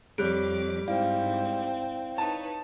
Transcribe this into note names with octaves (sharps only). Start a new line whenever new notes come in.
F2 G3 C#5 D6 F#6 D7
G#2 C4 E4 D5 F5
D#4 B4 C#5 A5